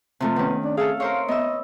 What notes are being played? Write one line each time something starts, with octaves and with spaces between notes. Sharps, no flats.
C3 F3 A3
D#3 B3 C#4
D4
G#4 A4 E5 F5
A#4 C5 C#5 F5
B3 D#5 E5